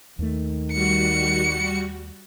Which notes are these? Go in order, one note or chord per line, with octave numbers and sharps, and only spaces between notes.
D#2 D#3 A3
G3 F#4 C#7